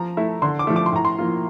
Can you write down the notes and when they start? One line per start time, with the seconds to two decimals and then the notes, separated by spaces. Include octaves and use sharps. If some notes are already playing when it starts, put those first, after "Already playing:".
Already playing: F3 A#5
0.17 A3 E4
0.42 D3 C6
0.59 D6
0.67 F3 A3
0.76 D6
0.86 C6
0.93 A2 A#5
1.05 C6
1.18 F3 A#3 F4